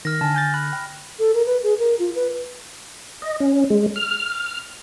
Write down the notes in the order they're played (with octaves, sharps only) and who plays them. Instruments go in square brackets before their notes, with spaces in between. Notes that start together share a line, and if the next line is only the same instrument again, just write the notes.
[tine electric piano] D#3 [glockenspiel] F6 A#6
[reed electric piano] D3 [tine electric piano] G#5 A5
[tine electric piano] G#5 G6 A6
[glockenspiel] B5 [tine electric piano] F#6
[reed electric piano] G5
[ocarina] A4
A#4
B4
G#4
A#4
F4
B4
[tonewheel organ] D#5
C#4
G#3
F6